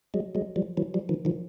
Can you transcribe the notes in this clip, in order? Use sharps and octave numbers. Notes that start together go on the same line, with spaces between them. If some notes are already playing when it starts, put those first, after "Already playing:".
F#3 G#3
F#3 G#3
F3 G3
E3 F#3
F3 G3
D#3 F3
D#3 F3